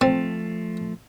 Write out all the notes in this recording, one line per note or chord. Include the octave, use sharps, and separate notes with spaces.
F3 A3 C4